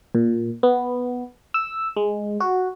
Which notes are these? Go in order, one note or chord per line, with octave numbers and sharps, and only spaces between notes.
A#2
B3
E6
G#3
F#4